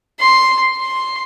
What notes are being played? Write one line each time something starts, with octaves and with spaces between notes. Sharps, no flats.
C6
C6